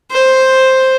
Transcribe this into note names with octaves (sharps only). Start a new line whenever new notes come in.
C5